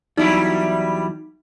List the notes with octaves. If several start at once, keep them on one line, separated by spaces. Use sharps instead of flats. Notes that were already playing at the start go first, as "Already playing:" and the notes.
E2 F#3 G3 D#4 E4